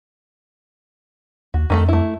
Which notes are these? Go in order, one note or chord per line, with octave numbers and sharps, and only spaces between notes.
D#2 F#4
F2 D#3 A3 A4
A3 E4